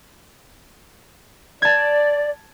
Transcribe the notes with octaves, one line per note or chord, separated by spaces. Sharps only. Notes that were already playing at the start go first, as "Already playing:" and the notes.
D5 A5 G#6